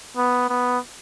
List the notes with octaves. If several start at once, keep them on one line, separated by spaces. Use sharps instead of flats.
B3
B3